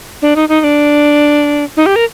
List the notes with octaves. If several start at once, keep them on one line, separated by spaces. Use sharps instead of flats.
D4
D#4
D#4
D#4
D4
D#4
G4
A#4